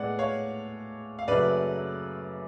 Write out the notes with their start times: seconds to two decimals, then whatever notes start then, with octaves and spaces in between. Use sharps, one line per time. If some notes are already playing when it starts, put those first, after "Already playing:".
Already playing: A2 G#3 B3 D5 F#5
0.19 C#5 F5
1.19 F5
1.28 F#2 C#3 F#3 A3 B4 D5